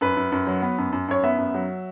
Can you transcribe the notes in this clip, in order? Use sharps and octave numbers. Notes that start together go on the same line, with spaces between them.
F#2 B4
F#2
F#2
F#3
B3
F#2
F#2
F#2 C#5
B3 E5
F#2
F#3